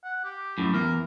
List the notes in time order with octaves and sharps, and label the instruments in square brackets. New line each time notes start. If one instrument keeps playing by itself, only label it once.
[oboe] F#5
G4
[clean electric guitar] F#2 A2
[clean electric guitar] E2 [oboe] A#4